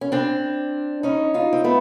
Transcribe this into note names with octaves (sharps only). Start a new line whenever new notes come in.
C#4
C4 D4
C#4 D#4
D#4 F4
C4
A3 B3